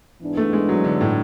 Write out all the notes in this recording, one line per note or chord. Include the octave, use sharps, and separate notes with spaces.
G#2 E3 B3 D4
A3
G#3
F#3
D3
A2